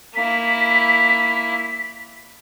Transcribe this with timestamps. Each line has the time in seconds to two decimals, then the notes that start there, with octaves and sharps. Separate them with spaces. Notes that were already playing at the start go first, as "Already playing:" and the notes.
0.16 A#3 E4 B6